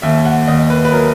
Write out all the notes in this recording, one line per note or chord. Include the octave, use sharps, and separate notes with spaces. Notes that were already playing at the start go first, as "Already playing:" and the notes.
D#2 E5
F#5
D#2 D#5
B4
B4
F#3 A#4